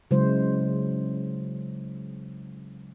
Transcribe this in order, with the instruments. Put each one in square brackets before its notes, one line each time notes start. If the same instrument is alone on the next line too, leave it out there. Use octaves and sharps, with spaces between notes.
[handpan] C#3 F#3 G#3 E4 C5